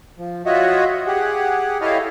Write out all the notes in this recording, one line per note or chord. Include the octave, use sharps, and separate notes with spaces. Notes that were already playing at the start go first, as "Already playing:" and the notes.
F3
F4 F#4 C#5 D#5 E5 F#5
G4 G#4 F#5
E4 G4 A4 C#5 D#5 F5